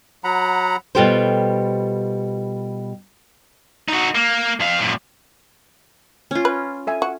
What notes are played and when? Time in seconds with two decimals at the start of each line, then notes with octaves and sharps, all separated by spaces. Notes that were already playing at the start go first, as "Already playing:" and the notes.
0.24 F#3 F#5 A#5 B5
0.95 B2 G3 F4 G4 A4 C5
3.88 D#4 F#4
4.15 A#3
4.60 F2 F5
4.79 F#2 A#2
6.31 C#4 F4
6.45 B4
6.87 A4 E5 G#5
7.02 F#4